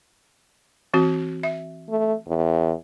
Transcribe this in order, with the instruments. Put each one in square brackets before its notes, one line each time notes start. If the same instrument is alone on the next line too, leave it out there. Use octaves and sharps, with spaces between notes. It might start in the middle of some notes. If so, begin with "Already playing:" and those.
[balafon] E3 C4 F#4
E5
[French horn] A3
E2